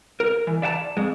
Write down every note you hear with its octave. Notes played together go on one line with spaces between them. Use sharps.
A#4
E3
D5 E5 F#5 A5 A#5
F2 G#3